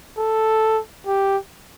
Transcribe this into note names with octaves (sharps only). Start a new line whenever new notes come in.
A4
G4